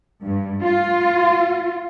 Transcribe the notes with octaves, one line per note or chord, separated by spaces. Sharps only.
G2
F4